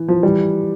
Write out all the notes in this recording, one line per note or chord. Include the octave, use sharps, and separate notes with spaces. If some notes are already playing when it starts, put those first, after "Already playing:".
Already playing: E3
F3
E3 G3